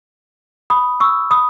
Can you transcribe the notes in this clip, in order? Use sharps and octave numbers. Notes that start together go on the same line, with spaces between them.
B5 D#6
C#6 E6
B5 D#6